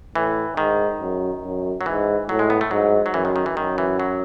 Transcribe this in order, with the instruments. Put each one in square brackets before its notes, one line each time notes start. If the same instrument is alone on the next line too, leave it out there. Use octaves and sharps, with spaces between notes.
[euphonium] A2 [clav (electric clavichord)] E3
[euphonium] G#2 [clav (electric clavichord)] D#3
[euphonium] F#2
F#2
[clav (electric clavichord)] F#3
[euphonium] G#2 [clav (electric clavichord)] E3
[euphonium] A2 [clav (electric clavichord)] F#3
[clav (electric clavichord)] G#3
B3
A3
[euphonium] G#2 [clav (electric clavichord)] F#3
[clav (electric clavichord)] F#3
[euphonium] F#2 [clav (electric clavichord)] E3
[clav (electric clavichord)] D#3
D#3
E3
[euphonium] F#2 [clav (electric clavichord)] D#3
[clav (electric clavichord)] E3
F#3